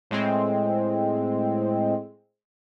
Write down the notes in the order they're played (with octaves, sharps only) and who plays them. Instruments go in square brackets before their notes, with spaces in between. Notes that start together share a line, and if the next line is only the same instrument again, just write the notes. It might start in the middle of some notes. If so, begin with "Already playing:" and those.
[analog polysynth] A2 G#3 C4